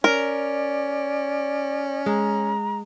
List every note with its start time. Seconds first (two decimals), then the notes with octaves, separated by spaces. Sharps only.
0.04 C#4 A#4 D5
2.06 G#3 A#5